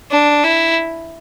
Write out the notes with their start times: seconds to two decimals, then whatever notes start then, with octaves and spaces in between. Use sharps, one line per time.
0.11 D4
0.44 E4